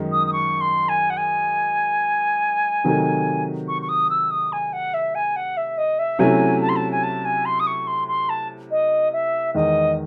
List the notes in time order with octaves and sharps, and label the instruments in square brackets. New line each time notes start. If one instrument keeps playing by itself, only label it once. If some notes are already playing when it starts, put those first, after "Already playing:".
Already playing: [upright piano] F#2 D#3 G#3 D#4
[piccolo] D#6
D#6
C#6
C6
G#5
F#5
G#5
[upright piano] C3 D#3 F#3 A3 D#4
[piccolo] C#6
C#6
D#6
E6
D#6
G#5
F#5
E5
G#5
F#5
E5
D#5
E5
[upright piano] C3 F#3 A3 C#4 E4 [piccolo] G#5
[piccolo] A5
C6
A5
G#5
A5
G#5
C6
D#6
C#6
C6
C6
A5
D#5
E5
[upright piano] E2 D#3 G#3 [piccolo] D#5